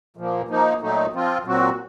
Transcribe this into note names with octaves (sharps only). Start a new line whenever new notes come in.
A#2 F3 A#3
F3 A#3 D#4
A#2 F#3 A3 D#4
F3 C4 F4
A#2 F#3 C4 F#4